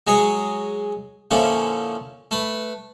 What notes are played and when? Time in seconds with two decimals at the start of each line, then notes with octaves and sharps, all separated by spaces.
0.07 F#3 G#3 G#4 C#5
1.31 A#2 D3 F3 C#4 E4
2.31 A3 B4